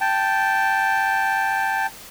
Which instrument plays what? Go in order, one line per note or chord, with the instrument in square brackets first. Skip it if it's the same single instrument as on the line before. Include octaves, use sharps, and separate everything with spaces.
[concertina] G5 A5